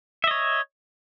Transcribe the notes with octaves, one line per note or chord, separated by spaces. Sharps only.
C#5 D#5 E5